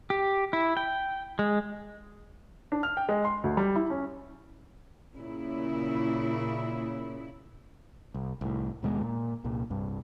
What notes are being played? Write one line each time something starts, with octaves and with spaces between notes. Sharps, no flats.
G4
E4
G5
G#3
D4
F6
G5
G#3
C6
D2
G3
E4
C#4
A#2 C#3 E4
C2
C2 A2
D#2 B2 G3 G#3
A#2
C2 A#2
C2 G2